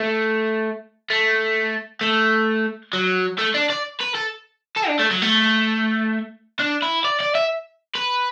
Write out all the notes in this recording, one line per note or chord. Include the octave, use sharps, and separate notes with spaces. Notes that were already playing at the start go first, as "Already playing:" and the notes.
Already playing: A3
A3
A3
F#3
A3
D4
D5
B4
A4
A4
D4
A3
F#3
A3
D4
E4
D5
D5
E5
B4